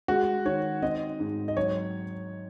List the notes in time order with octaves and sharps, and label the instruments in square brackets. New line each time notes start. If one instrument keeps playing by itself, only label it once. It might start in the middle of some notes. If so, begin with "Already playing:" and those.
[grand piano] G#3 F#4
D#3 C#5
C4 D#5
G#2
D#5
F#3 C#5